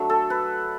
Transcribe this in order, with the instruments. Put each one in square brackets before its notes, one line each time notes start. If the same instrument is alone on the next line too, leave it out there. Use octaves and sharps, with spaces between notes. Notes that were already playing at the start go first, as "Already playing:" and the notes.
Already playing: [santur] F#3 A3 D4
A4
B4